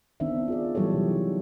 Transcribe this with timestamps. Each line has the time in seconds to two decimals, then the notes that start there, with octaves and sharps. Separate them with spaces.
0.20 D#3 B3 C4 D4 D#4 E5
0.48 F4 G#4 D5
0.75 E3 F#3 G3 G4 A4 C#5
0.94 C3
1.11 D#4